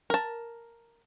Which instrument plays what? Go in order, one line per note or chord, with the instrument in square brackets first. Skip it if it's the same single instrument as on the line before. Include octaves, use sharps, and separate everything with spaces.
[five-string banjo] A#4 A5